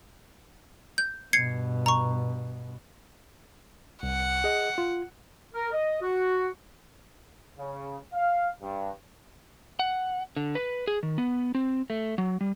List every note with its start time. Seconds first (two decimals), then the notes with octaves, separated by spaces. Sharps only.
0.98 G6
1.33 G2 B2 G#6 C7 C#7
1.86 A#5 C#6
4.03 C2 F#5
4.44 G#4 D#5
4.78 F4
5.54 A#4
5.72 D#5
6.01 F#4
7.58 C#3
8.13 F5
8.61 G2
9.79 F#5
10.36 D3
10.55 B4
10.87 G#4
11.03 D#3
11.18 B3
11.55 C4
11.90 A3
12.18 F#3
12.41 G3